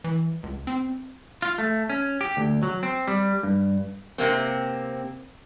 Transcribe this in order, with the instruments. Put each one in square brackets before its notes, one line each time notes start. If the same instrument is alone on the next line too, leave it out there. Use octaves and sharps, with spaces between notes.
[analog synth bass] E3
C#2
C4
[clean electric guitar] F4
A3
C#4
G4
D2
F#3
C4
G3
G2
[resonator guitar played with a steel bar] C3 A#3 C4